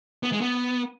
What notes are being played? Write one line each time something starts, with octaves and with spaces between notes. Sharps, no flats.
B3
G#3
B3